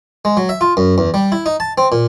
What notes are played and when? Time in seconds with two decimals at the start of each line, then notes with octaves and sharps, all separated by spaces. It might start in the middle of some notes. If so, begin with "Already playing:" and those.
0.25 G#3
0.37 F#3
0.49 E5
0.61 F4
0.77 F#2
0.98 E2
1.14 G3
1.32 E4
1.46 D#4
1.60 A5
1.78 C4
1.92 A#2